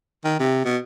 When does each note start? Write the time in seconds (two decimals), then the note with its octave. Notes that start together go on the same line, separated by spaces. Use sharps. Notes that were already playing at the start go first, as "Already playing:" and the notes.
0.24 D#3
0.40 C3
0.65 B2